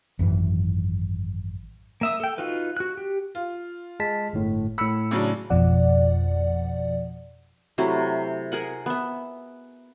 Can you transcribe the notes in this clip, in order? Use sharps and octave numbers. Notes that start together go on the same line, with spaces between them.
G#1 F#2 E3
A#3 E5 D#6
A4 G5
D#4 F4 F#4 B4
F#4 F#6
G4
F4
G#3 A5 B6
G1 A2
A2 B5 E6 C#7
C#3 F#3 D4
G#1 F2 B2 F3 D5 F#5
C3 F#3 A3 E4
G#4 A#4 F#5
B3 E5